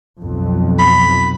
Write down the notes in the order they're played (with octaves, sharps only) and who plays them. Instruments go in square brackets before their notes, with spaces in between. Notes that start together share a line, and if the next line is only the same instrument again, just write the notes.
[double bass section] B1 F2
[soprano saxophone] B5